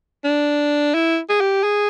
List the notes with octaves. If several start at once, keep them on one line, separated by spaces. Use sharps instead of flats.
D4
E4
G#4
G4
G#4